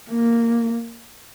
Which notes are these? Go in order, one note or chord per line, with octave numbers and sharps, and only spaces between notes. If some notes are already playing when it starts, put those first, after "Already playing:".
A#3